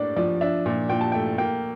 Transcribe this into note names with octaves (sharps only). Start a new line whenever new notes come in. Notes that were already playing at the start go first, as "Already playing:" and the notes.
Already playing: A2 A#3 D4 D5
F3 D5
D4 E5
A#2
A#2 G5
A5
A3 G5
A#3 G5